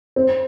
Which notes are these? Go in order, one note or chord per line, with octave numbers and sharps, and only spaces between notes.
C4